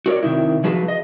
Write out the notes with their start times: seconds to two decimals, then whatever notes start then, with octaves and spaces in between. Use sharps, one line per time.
0.06 F#4 A#4 C#5 D5
0.23 C3 D#3 E4
0.64 F3 F#4 G#4 B4 A5
0.88 D#5